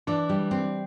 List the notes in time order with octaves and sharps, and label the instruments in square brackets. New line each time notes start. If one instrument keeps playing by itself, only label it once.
[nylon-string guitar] E3 [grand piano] D4
[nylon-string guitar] G3
C4